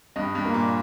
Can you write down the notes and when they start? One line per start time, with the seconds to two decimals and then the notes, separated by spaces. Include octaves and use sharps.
0.16 G2 D#5
0.35 G2
0.45 A#3
0.54 A#2